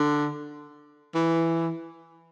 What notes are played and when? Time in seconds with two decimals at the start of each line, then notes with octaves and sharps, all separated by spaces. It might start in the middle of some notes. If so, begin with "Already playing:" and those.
Already playing: D3
1.15 E3